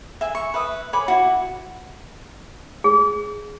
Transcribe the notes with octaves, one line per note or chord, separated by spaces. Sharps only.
E5 G#5
C#6
B4 E5 D#6
C#5 G#5 B5 D6
E4 F#4
G#4